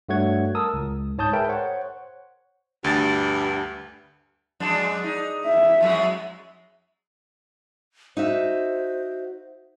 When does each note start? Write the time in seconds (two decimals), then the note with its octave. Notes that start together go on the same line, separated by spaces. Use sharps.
0.09 G2 A3 F#4 C#5 F#5 G#6
0.55 A#4 A5 D#6 E6
0.74 C#2
1.18 G#2 C#5 A5 D#6 G6
1.33 G#4 A#4 B4 E5 G5 A5
1.49 C5 C#5 F#5
2.84 D2 G2 A6
4.60 F2 G#3 D4
5.04 D#4
5.46 E5
5.81 F2 F#3 G#3
8.17 D#4 F#4 C5 E5